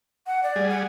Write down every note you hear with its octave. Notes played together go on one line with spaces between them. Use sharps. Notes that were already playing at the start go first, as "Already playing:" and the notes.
F#5
D5
G3 G#4
F#5